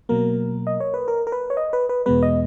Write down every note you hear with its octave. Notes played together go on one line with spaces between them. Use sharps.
B2 F#3 A#3 A#4
D#5
C#5
B4
A#4
A#4
B4
C#5
D#5
B4
B4
E2 B2 G#3 B3 B4
D#5